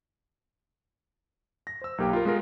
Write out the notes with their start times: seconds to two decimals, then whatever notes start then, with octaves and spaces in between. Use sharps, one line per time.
1.67 A#6
1.81 C5 E6
1.98 B1 A#3 G4 F5 G5
2.13 F4 A#4
2.25 G#3 B3 F4 A#4